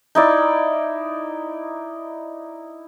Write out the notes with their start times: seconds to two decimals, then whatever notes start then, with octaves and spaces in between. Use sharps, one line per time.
0.15 D#4 E4 D5